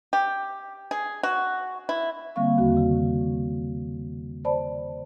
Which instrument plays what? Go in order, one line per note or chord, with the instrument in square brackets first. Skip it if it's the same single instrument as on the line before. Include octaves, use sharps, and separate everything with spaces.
[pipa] G4
G#4
F#4
E4
[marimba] D3 G3 A#3 C4 F5 C#6
E2 D#3 F#4
C#3
C5 D5 A5 B5